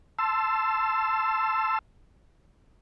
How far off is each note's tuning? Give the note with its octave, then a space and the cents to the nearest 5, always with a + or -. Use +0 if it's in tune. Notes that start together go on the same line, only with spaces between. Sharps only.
A5 +0 C6 +0 E6 +15